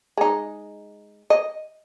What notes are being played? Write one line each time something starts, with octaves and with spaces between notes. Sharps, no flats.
G#3 D#4
D#5